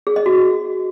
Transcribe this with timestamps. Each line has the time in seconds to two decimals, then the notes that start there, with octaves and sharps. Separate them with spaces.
0.07 G#4
0.16 D#5
0.26 F#4